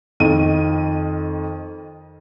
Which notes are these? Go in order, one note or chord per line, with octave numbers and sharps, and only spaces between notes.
F2 D#3 D#7